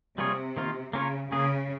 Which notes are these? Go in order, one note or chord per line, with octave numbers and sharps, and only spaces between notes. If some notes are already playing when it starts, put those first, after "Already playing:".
C3 G3 A#3 F4 G#4 C#5
D#3 A#3 F4
C#3 A#3 C#4 F4 A#4 C#5
C#3 A#3 C#4 G#4